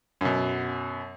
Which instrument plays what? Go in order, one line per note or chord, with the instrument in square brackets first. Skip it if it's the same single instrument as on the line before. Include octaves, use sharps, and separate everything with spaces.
[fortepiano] F#2 B2